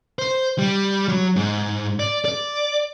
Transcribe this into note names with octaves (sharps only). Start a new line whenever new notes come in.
C5
G3
F#3
G#2
D5
D5